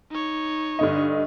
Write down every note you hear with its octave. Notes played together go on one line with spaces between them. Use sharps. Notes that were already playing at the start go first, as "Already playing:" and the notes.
D#4 C#5
G2 D3 D#5